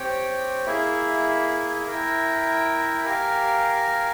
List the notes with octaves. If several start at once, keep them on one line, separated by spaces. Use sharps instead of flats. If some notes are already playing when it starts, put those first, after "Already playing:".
Already playing: C4 G4 C#5 G5
A#3 E4 G#4 E5
E4 A#4 E5 G5
G4 A#4 F5 G#5